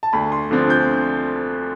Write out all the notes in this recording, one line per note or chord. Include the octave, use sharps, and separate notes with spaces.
A5
D2 B5
C6
D3 F3 C4
G6